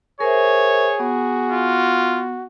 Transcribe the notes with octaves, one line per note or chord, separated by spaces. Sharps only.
G#4 A#4 C5 C#5 E5
B3 F#4
F4